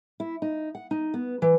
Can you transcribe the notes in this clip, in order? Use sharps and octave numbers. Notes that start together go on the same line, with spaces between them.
E4
D#4
F#5
D#4
B3
E3